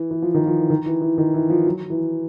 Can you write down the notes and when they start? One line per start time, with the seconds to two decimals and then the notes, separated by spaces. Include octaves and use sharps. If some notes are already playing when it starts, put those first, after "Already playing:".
Already playing: E3
0.11 E3
0.22 F3
0.34 D#3
0.46 F3
0.58 E3
0.70 D#3
0.86 E3
1.01 E3
1.18 D#3
1.34 E3
1.50 F3
1.66 F#3
1.90 E3